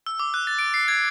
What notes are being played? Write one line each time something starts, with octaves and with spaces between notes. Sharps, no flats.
E6
D6
F#6
A6
D7
C7
G#6